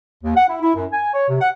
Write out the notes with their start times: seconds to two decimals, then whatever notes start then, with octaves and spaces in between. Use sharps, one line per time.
0.24 D#2
0.37 F#5
0.49 E4
0.62 E4
0.75 F#2
0.93 G#5
1.14 C#5
1.29 C3
1.41 F#5